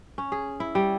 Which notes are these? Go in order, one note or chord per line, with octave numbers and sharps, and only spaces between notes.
C#4
G#4
E4
G3